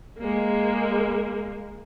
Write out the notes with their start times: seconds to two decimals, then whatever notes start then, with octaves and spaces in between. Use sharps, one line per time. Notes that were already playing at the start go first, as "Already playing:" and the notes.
0.19 G#3 A#3